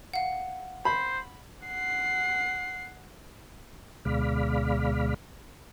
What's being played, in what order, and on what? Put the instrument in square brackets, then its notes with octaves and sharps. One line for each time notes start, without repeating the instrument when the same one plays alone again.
[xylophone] F5 F#5
[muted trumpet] C5 [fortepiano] B5
[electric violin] F#5 C7
[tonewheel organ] D2 B2 G#3 D5 F5 B5